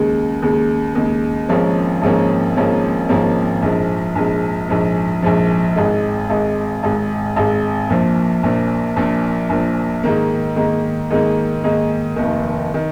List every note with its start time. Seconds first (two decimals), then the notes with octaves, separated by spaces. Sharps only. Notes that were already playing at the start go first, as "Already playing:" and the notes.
Already playing: D#2 C#3 G#3
0.42 D#2 C#3 G#3
0.95 D#2 C#3 G#3
1.49 G#1 G#2 F3 A#3 C#4
2.02 G#1 G#2 F3 A#3 C#4
2.56 G#1 G#2 F3 A#3 C#4
3.09 G#1 G#2 F3 A#3 C#4
3.62 A#1 G#2 F3
4.15 A#1 G#2 F3
4.69 A#1 G#2 F3
5.22 A#1 G#2 F3
5.76 G#1 G#2 G#3
6.30 G#1 G#2 G#3
6.83 G#1 G#2 G#3
7.36 G#1 G#2 G#3
7.90 A#1 A#2 F3
8.43 A#1 A#2 F3
8.96 A#1 A#2 F3
9.49 A#1 A#2 F3
10.03 G#2 D#3 A#3
10.56 G#2 D#3 A#3
11.11 G#2 D#3 A#3
11.64 G#2 D#3 A#3
12.16 F1 D#2 D#3
12.74 D#3